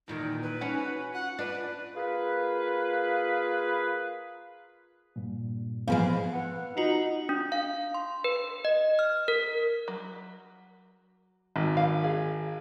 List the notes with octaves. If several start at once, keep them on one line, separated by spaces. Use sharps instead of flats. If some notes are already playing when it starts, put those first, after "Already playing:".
E2 A#2 D#3 D#4
D#4 B4
C#4 F#4
F4 F#5
D4 B4
A#3 F4 G#4 B4
G2 A#2
G#2 E3 F3 G#3 B3 F5
B3 B4 F#5
D#4 F4 F#4
D4
F5
C6
B4
D#5
F6
A#4
F#3
G#1
F#3 F5
G#4